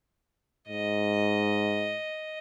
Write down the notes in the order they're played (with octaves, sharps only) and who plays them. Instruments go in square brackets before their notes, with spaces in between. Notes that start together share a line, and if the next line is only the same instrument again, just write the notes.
[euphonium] G#2 [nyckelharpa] D#5